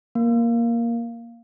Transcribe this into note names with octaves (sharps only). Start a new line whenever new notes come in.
A#3